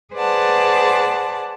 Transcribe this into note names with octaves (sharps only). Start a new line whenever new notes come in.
G#4 B4 C5 D5 F#5 A5